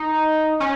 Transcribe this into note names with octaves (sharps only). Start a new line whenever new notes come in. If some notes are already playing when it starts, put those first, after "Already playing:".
Already playing: D#4
C#4